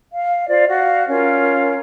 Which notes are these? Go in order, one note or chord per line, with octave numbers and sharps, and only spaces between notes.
F5
F4 C5 D5
F#4 F5
C#4 F4 A#4